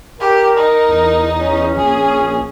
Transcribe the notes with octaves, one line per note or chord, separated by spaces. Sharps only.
G4 A#4
D#4
E2
C#4
A#1 G#4